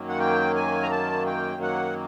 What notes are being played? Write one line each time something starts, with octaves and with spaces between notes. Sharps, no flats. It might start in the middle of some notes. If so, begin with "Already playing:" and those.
Already playing: F#2 D#3 F#3 A#3
F#5
G5
G#5
A#5
A5
G5
F#5